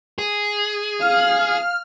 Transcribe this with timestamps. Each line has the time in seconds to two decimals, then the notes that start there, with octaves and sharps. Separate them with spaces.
0.19 G#4
1.01 F5 F6